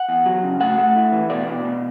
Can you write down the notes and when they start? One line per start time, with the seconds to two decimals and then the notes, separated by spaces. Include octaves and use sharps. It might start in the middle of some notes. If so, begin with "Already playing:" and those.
Already playing: F#5
0.09 E2
0.26 F#3
0.43 C#3
0.60 A3 F#5
0.78 A3
0.95 E4
1.12 E3
1.30 B2 D5
1.47 B2
1.65 B2